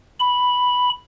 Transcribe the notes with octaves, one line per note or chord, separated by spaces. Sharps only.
B5